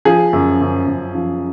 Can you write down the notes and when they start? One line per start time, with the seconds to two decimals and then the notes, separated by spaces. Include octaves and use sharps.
0.05 F3 G#4
0.33 F#2
0.61 F#2
0.87 F#2
1.15 F3